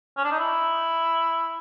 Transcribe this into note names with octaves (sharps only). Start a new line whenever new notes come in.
C#4
D4
D#4
E4